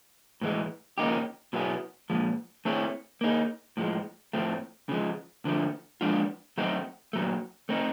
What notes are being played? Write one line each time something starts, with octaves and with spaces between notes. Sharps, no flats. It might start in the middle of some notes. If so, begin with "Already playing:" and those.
A2 E3 G#3
C#3 F3 A#3 D#4 G4
B2 F#3 B3 E4 G#4
A#2 F3 G#3
A3 C4 E4 G#4 C#5
A#3 D#4 G#4
A2 F3 G#3
A2 F3 A3 C4
C#3 F3 G#3
D3 F3 A3
F3 G#3 B3 D4 F4
F#3 A3 C4 D#4 F#4
A#2 F#3 A3
A3 C4 D#4